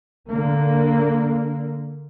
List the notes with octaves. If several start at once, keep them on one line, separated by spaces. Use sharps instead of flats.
D3 A#3